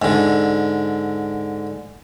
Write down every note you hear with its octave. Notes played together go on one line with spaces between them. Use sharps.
G#2 D3